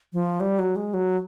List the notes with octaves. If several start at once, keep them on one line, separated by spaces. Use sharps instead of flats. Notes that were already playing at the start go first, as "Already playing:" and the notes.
F3
G3
F#3
G#3
F#3